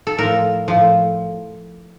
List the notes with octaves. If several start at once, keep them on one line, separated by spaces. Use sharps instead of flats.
A4
A2 F3 A#4
A2 F3